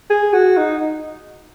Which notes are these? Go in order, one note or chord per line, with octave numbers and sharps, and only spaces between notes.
G#4
F#4
D#4